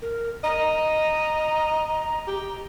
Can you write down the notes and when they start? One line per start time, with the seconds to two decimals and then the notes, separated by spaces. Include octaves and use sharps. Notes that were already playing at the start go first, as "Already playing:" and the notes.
0.02 A#4
0.44 D#5 A#5
2.27 G4